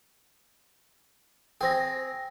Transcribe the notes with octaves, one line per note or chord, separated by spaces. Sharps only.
C4 G#4 G5 A#6